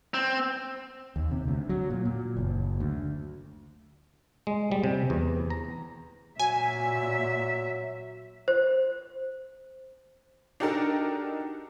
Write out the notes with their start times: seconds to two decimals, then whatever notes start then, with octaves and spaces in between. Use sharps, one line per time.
0.14 C4
1.16 D#2
1.31 C3
1.48 D2
1.69 F#3
1.90 A#2
2.05 A#2
2.37 F#1
2.80 D2
4.47 G#3
4.72 G3
4.84 C3
5.10 E2
5.50 A#5
6.39 A#2 F#3 E5 G#5
8.48 C5
10.60 D4 D#4 F#4 G4 A4 A#4